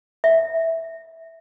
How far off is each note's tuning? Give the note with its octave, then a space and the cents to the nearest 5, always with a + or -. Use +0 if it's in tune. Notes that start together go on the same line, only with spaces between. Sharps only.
E5 -10